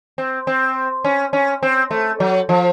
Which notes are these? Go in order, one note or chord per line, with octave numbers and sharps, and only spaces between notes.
C4
C4
C#4
C#4
C4
A3
F#3
F3